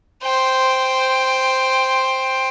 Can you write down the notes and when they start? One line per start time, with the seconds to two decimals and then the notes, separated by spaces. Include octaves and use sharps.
0.23 C5 G5